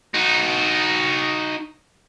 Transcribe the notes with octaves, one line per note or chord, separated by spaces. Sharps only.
D#4 F#4